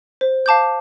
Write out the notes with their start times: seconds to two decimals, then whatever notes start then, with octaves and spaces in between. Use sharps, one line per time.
0.21 C5
0.46 F5 A5 D6 G6